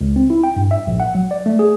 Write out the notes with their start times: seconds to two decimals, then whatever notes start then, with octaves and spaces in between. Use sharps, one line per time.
0.01 C#2
0.16 C4
0.30 E4
0.44 G5
0.56 G2
0.71 E5
0.87 A#1
1.00 F#5
1.15 F#3
1.31 D5
1.46 A3
1.59 G#4